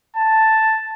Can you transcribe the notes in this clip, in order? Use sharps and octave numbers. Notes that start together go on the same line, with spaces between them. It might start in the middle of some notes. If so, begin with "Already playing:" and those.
A5